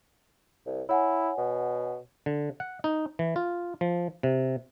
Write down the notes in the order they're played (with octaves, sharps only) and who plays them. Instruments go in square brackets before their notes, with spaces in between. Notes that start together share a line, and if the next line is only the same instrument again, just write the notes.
[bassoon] C2
[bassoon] E4 [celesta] C#5 F#5 G#5
[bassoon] B2
[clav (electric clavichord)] D3
F#5
D#4
E3
F4
F3
C3